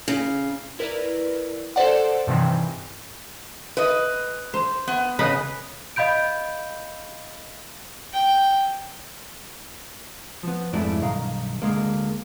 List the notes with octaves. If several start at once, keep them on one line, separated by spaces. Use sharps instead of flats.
C#3
E4 A#4 B4 D5
A4 C5 D5 F#5
G2 C3 D#3 E3
B4 D#5
C5
B3
C#3 B4 D#5
D#5 F5 B5 G6 D7
G5
F3 B3
F2 G#2 G#3 A3 E4 D5
B1 G2 D#3 A#4 F5
D2 G#3 A#3